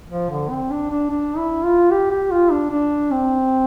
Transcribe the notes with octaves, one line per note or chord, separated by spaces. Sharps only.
F3
D3
C4
D4
D4
D4
E4
F4
G4
G4
F4
D4
D4
C4